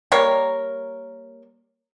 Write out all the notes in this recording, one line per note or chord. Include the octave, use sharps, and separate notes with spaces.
G3 A#3 A#4 C#5